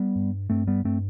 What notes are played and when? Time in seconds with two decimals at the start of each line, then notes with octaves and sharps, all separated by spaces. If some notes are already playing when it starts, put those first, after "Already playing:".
Already playing: G3 B3
0.15 G2
0.50 G2 A3 C4
0.67 G3 B3
0.84 G2 A3 C4